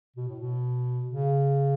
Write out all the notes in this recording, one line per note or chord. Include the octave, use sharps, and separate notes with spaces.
B2
A2
B2
C#3